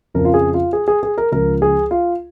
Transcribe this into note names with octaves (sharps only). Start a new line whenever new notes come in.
F2 C#3 F3 A#4
F4
G#4
F4
G#4
G#4
G#4
A#4
C#2 C#3 F3 A#4
G#4
F4